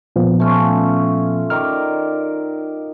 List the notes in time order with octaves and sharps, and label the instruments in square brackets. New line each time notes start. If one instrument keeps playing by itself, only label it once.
[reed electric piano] A#2 F3 B3
[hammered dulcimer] A3 C#4 F4
[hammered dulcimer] D#3 D5 A#5 [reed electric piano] F6